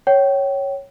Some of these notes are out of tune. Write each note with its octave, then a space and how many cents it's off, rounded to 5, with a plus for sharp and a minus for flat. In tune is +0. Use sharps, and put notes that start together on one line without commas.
C#5 -5 G5 -30